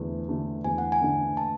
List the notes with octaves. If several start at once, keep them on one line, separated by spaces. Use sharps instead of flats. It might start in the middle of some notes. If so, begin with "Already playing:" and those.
Already playing: E2 D3 A3
D3 A3 D4
E2 G#5
F#5
G#5
D3 A3 D4
A5